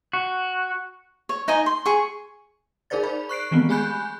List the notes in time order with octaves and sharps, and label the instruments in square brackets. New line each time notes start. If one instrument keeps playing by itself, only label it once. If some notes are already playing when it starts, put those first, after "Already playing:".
[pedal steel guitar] F#4
[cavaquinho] C#5
D#4 D#5 G#5
C6
G#4 C#6
[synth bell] D#4 G#4 A#4 C5 D5 A6
C5 D5 B5
C#6 F#6 C7 D7
D#3 E3 G#3 A3 B3 C4
G4 G#4 G#5 B5 F#6 G6